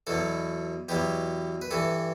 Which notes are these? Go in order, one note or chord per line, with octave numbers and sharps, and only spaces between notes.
E2 B2 F#3 A4
E2 B2 F#3 G4
B4
G2 E3 A4